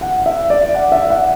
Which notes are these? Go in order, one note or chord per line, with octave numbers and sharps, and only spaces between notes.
F#5
E5
D5
F#5
E5
F#5